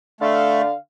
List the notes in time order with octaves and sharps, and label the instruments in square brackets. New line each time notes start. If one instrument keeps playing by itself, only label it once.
[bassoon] D3 [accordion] A3 [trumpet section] F5